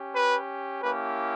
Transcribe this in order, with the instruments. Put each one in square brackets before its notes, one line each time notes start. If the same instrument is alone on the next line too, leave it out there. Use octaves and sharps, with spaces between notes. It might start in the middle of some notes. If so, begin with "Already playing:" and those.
Already playing: [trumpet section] C#4 G4
B4
A#3 C#4 E4 G4 B4